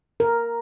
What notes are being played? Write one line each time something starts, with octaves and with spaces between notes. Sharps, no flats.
A#4